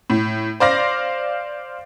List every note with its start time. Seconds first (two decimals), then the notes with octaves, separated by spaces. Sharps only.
0.10 A2
0.60 C5 D5 F5 A#6